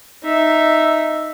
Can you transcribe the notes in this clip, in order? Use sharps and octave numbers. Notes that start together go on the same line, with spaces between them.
D#4 E5